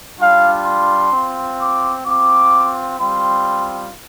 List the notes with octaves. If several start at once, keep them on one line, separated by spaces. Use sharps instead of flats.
G3 D4 F4 F5
C6
C4 F4
D6
C4 F4 D6
G3 C4 F4 C6